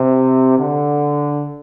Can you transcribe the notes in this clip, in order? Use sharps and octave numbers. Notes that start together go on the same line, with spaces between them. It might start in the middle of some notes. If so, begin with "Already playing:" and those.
Already playing: C3
D3